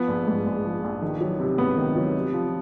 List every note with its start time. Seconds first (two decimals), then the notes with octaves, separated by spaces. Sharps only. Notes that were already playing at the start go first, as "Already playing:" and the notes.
Already playing: F3 B3
0.08 A#1
0.28 G#2
0.46 A#1
0.65 F3
0.84 A#1
1.02 D#3
1.21 F#3
1.40 C3
1.58 C#2 B3
1.77 D#3
1.96 F#3
2.15 C3
2.33 F3